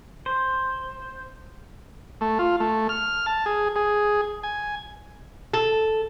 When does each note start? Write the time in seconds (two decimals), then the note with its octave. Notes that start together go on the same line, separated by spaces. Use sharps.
0.26 C5
2.21 A3
2.39 F4
2.60 A3
2.89 F6
3.26 A5
3.46 G#4
3.76 G#4
4.43 G#5
5.54 A4